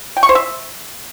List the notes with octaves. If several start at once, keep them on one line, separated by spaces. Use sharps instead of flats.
G5
C#6
C5
E5